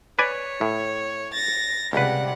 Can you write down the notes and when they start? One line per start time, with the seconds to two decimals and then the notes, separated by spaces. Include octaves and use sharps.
0.19 B4 C#5 D5 G#5
0.61 A2
1.34 A6 A#6
1.93 C#2 C3 G3 B4 F#5